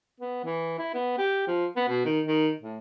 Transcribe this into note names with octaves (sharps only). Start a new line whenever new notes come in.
B3
E3
E4
B3
G4
F3
B3
B2
D#3
D#3
A2